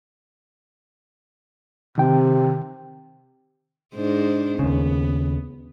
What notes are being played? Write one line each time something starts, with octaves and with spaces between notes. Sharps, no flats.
C3 D#3 G5
G#2 D4 C5
D#2 C#3 B3